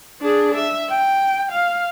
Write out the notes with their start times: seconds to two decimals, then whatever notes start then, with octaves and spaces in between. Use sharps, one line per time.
0.21 D4 G#4
0.55 E5
0.90 G5
1.52 F5